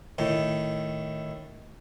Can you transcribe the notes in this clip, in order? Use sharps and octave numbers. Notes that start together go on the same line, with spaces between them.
A2 D#3